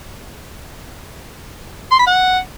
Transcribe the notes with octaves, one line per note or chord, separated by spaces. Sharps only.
C6
B5
F#5